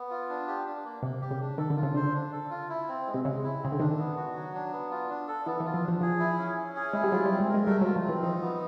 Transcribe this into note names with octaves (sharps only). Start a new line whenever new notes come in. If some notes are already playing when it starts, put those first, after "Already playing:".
Already playing: B3
F4
D4
G4
D4
A#3
C3 A#3
G4
C#3
D4
D#3 A4
D3
F4
C#3
D3 C5
D4
A4
F4
E4
C4
G#3
C3
C#3 G#3
E4
C#3 C4
D3
D#3 D4
B3
F#4
F#3
D4
B3
F4
D4
A4
E3 B3
E3
F4
F3
D4
F3
F3 G#4
E4
C#4
C#4
G#4
G#3 E4
G3
F#3 F4
G3
C4
G#3
A#4
G#3
G3 A3
F#3 F4
F3
E3 C4
F3 D#4
B3